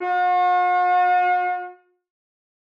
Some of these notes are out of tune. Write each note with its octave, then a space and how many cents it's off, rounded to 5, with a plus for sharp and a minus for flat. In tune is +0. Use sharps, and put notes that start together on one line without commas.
F#4 -45